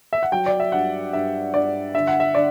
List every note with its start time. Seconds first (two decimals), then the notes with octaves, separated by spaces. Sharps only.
0.13 E5
0.23 F#5
0.32 F#3 G5
0.46 D5
0.60 E5
0.72 G2 F#5
1.13 G2 E5
1.54 G2 D5
1.94 D3 E5
2.07 F#5
2.20 E5
2.35 D3 D5